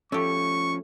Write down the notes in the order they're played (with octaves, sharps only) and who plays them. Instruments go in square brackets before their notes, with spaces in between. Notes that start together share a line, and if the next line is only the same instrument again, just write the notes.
[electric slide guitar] F3 C#4 [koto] A3 G4 [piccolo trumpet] C#6